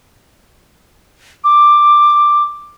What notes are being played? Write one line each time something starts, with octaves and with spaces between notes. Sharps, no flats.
D6